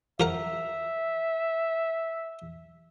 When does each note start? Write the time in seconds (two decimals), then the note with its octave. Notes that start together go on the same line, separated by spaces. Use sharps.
0.20 F3 A#4 E5 F#5